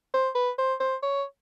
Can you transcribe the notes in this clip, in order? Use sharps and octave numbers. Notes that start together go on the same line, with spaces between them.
C5
B4
C5
C5
C#5